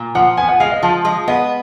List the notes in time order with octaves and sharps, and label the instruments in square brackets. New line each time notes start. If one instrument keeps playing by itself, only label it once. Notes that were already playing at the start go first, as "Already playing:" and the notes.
Already playing: [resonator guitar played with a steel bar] A#2
[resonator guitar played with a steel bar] F3 [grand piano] F#5
[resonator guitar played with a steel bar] B3 [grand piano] G#5
[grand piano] F#5
[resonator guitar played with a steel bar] G#3 [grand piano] F5
[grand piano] D#5
[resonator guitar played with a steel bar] F3 [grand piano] F5
[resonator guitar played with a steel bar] G#3
[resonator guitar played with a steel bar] B3 [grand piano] D#5